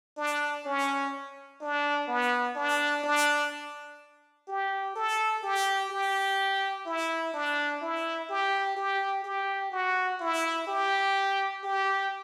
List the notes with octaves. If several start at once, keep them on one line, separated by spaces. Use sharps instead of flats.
D4
C#4
D4
B3
D4
D4
G4
A4
G4
G4
E4
D4
E4
G4
G4
G4
F#4
E4
G4
G4